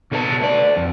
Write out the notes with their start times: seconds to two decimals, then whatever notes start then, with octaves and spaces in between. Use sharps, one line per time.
0.11 B2 D3 A4 B4 C#5 A5
0.41 A3 D5
0.77 F2